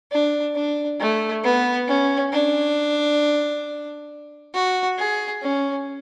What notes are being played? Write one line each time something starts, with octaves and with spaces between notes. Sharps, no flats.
D4
D4
A3
B3
C#4
D4
F#4
G#4
C#4